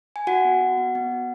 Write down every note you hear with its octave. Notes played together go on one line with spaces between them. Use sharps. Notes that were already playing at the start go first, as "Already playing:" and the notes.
G#5
F#4 F#5
B3
F#4
B3
B3
F#4